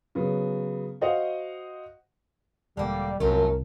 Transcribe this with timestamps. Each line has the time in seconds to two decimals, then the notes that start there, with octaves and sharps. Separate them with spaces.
0.15 C#3 F#3 B3
1.01 F#4 C5 D#5 F5 F#5
2.77 E1 D3 G3 A#3
3.20 C2 F#2 A3 F4 A#4